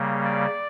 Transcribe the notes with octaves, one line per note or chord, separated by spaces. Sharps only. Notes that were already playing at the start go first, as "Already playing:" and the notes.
Already playing: C#3 G3 A#3
D5